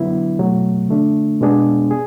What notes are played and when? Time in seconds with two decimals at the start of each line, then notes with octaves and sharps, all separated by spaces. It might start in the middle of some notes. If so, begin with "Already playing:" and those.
Already playing: D3 F#3 B3 E4
0.39 B2 F#3 A3
0.89 D3 A3 D4
1.41 B2 G#3 B3 D4 G#4
1.91 G#4